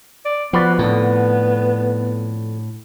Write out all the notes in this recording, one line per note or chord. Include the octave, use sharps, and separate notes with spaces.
D5
F3 B3 F#4 B4 D5
F2 A2 D3